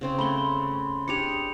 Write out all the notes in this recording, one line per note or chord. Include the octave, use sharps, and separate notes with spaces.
C#3 C4 C#4
A3 B5 C6 G7
D4 G4 G#4 C#7 F7